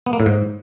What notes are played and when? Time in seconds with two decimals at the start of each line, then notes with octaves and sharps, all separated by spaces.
0.06 B3
0.13 A#3
0.20 A2
0.26 G#2